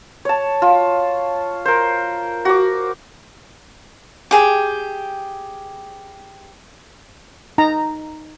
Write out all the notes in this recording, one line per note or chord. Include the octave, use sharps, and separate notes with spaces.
C#5 A5
F4
A#4 C5
F#4 D6
G4 G#4 G5
D#4 A#5